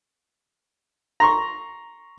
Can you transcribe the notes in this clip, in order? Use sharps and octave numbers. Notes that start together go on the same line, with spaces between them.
A#5 C6 C#6